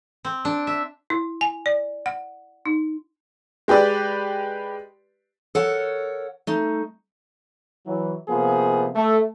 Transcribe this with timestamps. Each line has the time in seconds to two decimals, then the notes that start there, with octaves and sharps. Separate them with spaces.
0.25 C4
0.45 D4
0.67 E5
1.10 E4
1.41 G#5
1.66 D5
2.06 F#5
2.66 D#4
3.68 G#3 G4 B4 D5
5.55 A4 A#4 C#5 F#5
6.47 A3 D#4
7.86 E3 F#3
8.29 C3 F3 A#3 B3 G#4
8.96 A3